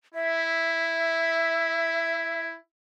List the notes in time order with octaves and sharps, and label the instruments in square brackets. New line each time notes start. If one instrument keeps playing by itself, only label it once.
[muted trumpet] E4 [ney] E5